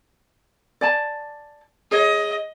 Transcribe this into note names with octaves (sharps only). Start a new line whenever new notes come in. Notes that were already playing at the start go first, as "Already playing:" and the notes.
D5 G#5 A5
G#4 C#5 D#5